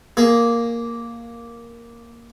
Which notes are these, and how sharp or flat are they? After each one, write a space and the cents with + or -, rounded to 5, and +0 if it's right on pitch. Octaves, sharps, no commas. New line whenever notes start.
A#3 +0 G#4 +0